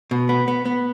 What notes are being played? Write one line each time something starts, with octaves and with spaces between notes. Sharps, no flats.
B2
B3
B3
B3